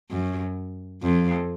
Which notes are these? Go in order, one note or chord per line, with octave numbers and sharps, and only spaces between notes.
F#2
F2